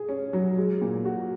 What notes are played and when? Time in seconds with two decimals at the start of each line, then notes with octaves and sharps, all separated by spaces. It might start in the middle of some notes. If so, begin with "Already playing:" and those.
Already playing: G#4
0.09 C#4
0.33 F#3
0.58 G#3
0.81 A#2
1.05 F#4